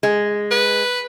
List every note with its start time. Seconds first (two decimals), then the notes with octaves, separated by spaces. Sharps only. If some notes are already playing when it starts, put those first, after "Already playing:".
0.03 G#3
0.51 B4